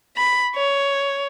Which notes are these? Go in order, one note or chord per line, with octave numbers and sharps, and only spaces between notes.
B5
C#5